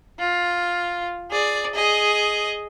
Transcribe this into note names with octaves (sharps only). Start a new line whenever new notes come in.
F4
G#4 D5
G#4 D#5